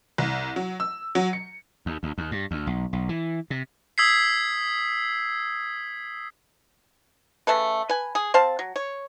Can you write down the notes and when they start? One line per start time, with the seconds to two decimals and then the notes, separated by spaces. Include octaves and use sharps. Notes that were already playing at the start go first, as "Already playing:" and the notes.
0.18 C2
0.56 F#3
0.80 E6
1.15 F#3
1.33 C#7
1.86 D#2
2.03 D2
2.18 D#2
2.31 G2
2.51 D2
2.67 B1
2.93 B1
3.09 E3
3.50 C3
3.98 D#6 E6 G#6 B6 C7
7.47 C#3 A3 A4 B4
7.89 B4 G#5
8.15 G#4
8.34 C4 C5 F5 A5
8.59 F#3
8.76 C#5